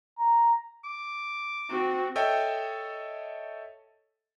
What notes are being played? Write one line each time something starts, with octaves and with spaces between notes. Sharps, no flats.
A#5
D6
C4 F#4
A4 C#5 D#5 E5 G5